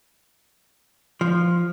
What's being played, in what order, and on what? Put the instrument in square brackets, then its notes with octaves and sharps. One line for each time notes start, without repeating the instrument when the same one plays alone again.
[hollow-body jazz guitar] F3